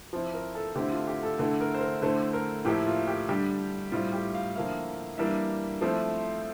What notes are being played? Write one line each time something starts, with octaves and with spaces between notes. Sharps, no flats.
F3 C4 E4
A#4
A4
D3 A3 C4 E4 G4
F4
G4
A4
D3 A3 E4 A4
A#4
C5
A#4
D3 A3 E4 C5
A#4
A2 F3 A#3 E4 G4
F4
G4
D3 G3 D4 G4
A2 G3 C4 E4 F4
G4
F5
D3 F3 A#3 E4 F5
E3 G3 A#3 D4 E5
F3 A3 C4 E4